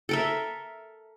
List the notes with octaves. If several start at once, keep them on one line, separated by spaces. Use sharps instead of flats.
A4 A#4 E5